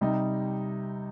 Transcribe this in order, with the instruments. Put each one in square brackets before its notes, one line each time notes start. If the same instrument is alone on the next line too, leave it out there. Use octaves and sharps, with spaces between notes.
[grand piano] C3 G3 D#4